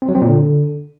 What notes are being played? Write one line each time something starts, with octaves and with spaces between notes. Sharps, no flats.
C4
F#3
C4
A#2
D3